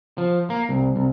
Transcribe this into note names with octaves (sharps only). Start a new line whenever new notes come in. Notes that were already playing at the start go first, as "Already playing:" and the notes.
F3
A#3
C2
C2